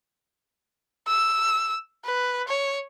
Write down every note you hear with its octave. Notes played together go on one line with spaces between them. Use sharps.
E6
B4
C#5